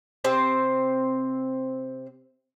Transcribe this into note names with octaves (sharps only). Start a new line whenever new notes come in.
C3 C4 C5